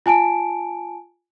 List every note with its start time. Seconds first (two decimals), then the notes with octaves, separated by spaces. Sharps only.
0.06 F4 G#5 A5 D7